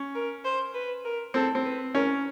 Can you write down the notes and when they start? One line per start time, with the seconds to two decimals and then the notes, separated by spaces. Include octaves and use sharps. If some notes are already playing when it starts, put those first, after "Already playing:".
Already playing: C#4
0.15 A#4
0.45 C5
0.74 B4
1.05 A#4
1.34 C4 A4
1.55 C4
1.64 B4
1.95 C#4 A#4